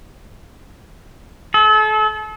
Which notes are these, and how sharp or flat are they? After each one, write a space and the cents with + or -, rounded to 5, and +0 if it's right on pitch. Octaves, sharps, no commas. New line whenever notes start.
A4 -35